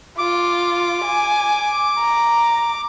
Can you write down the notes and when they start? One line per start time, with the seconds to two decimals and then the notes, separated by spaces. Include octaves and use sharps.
0.18 F4 D6
1.04 G#5
1.99 A#5